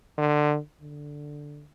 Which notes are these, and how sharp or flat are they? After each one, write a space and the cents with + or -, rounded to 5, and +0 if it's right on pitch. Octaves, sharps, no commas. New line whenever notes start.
D3 +20
D3 +0